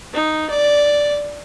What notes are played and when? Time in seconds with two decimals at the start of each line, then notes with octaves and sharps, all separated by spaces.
0.14 D#4
0.50 D5